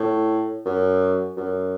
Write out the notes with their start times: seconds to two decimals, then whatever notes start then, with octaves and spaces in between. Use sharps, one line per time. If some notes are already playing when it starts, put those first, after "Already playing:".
Already playing: A2
0.66 F#2
1.37 F#2